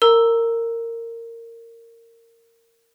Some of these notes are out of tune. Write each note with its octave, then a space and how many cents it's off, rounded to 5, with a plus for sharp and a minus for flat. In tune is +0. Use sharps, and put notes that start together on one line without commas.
A#4 -20 A#5 +0 E6 +0